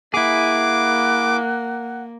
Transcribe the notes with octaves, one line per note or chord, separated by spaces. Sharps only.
A#3 E4 G#4 F#5 D6